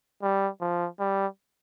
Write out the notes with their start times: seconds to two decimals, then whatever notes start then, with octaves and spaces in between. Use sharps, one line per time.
0.22 G3
0.61 F3
1.00 G3